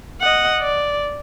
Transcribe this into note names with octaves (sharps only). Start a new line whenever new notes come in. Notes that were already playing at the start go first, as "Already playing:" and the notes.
D#5 F#5
D5